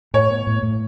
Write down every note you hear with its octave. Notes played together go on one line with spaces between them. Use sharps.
A2 C#5
B3
A2
A2